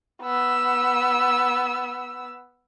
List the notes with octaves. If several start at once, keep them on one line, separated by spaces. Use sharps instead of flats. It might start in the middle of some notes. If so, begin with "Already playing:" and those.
B3 E6